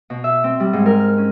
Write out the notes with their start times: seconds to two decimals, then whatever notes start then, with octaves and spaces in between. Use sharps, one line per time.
0.10 B2
0.24 E5
0.44 C4
0.60 G3
0.73 G#2
0.86 A#4
0.99 F6
1.17 C#4